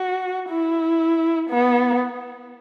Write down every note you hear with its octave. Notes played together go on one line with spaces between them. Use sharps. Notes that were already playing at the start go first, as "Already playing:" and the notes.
Already playing: F#4
E4
B3